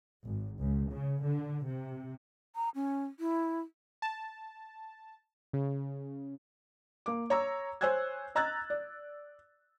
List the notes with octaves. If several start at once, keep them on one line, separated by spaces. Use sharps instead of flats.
G#1
C#2
C#3
D3
C3
A#5
C#4
E4
A5
C#3
A#3 D6
C#5 A#5 E6
C5 C#5 G#5 E6 F#6 G#6
D#5 A#5 E6 F#6 G#6 A6
D5